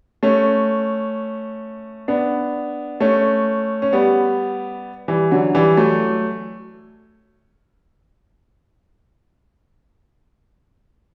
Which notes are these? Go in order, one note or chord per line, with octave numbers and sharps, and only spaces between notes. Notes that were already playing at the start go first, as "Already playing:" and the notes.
A3 C#4
B3 D4
A3 C#4
C#4
G3 B3
E3 G3
D3 F#3
E3 G3
F#3 A3